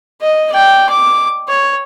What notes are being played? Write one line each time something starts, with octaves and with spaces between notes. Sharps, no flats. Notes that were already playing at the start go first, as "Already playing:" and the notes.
D#5
D5 G5
D6
C#5